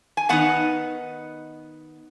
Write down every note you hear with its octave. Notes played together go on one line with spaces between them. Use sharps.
G#5
D#3 B3 D#4 F#5